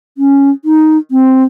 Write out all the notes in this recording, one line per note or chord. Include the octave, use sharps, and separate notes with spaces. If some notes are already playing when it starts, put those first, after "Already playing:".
C#4
D#4
C4